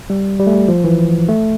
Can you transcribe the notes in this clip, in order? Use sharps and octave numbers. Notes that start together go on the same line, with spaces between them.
G3
G3
A3
G3
F3
E3
A3